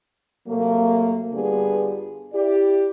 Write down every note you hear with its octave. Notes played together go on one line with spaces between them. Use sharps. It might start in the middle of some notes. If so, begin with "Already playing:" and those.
C3 F#3 A3 A#3
G2 D3 G3 B3 F4 G#4
E4 G4 D5